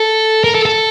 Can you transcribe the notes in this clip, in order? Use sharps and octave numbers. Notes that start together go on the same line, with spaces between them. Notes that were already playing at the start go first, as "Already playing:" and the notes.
Already playing: A4
A#4
A4
A4